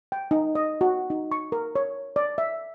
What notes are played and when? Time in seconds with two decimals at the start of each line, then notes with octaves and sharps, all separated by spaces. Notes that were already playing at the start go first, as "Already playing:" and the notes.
0.12 G5
0.31 D#4
0.55 D#5
0.81 F#4
1.10 D#4
1.32 C#6
1.52 A#4
1.76 C#5
2.16 D5
2.38 E5